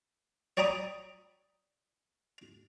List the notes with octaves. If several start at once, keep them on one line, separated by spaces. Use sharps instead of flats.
C#5 D5 G5 A#5 B5 D#6